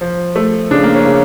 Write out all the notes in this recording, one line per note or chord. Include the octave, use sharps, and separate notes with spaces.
F3
A3
C#3 D4
A#3
C#4
C#3